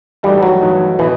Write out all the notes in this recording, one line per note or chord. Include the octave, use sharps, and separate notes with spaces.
G2 E3 G3 A3 D#4 F#4
F#3
G2 E3 A3 D#4 F#4
B2 E3